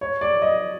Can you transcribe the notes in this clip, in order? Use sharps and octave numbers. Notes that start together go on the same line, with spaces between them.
C#5
D5
D#5